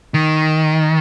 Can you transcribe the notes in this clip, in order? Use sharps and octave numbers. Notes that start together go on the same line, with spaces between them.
D#3